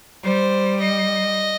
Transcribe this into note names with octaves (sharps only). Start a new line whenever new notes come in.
G3 C5
D#5